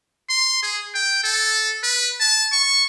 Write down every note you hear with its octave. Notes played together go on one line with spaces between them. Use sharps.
C6
G#4
G5
A4
B4
A5
C#6